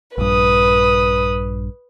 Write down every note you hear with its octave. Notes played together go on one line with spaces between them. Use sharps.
A#1 G2 B4 D#6